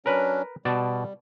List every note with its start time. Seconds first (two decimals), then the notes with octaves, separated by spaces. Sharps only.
0.06 F#3 C#4 D4 A#4 B4
0.65 B2 G3 D5 A5